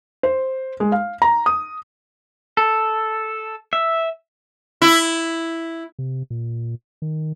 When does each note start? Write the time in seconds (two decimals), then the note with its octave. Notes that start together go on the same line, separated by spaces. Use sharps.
0.23 C5
0.80 G#3
0.92 F5
1.22 A#5
1.46 D#6
2.57 A4
3.73 E5
4.82 E4
5.99 C3
6.30 A#2
7.02 D#3